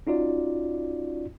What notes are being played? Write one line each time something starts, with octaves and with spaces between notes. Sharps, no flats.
C#4 D#4 F4 F#4 D5